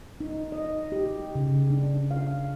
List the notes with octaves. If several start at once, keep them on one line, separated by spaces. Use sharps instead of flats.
D#4
D#5
G4
C#3
D4
F5